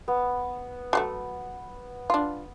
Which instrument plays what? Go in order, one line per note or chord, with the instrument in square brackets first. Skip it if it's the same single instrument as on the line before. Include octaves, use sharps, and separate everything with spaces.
[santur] B3
[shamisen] F#3 G#3 A3
D4 F4